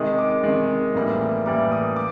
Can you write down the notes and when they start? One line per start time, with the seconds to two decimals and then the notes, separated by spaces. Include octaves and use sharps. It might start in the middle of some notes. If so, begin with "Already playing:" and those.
Already playing: C3 D#3 G#3 D#6
0.18 D6
0.44 C3 D#3 G#3
0.95 A2 E3 G3 A#3
1.46 A2 E3 G3 A#3 D6
1.72 D#6
1.96 D6